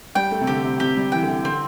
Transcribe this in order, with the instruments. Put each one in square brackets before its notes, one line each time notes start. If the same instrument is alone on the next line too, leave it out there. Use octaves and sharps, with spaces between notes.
[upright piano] G3 [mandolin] G5
[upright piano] A3
C3
[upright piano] D3 [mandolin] G4
[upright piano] C3
[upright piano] C3 [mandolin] G4
[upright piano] G3
[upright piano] E3 [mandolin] G5
[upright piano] D3
E3
[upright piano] D3 [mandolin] C4